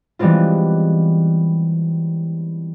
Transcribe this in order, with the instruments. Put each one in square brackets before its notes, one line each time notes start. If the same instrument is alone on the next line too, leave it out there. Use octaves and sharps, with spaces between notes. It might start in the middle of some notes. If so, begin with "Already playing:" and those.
[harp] E3 G3 G#3 B3 C4 F4